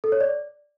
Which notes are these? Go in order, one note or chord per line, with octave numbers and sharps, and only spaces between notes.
A4
C#5
D5